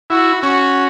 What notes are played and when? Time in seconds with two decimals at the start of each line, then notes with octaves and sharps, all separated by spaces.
0.10 E4 F#4
0.42 C#4 F#4